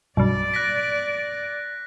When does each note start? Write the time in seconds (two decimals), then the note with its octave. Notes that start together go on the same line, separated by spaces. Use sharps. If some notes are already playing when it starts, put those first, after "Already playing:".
0.17 B1 G2 D5
0.54 F#6 A#6 B6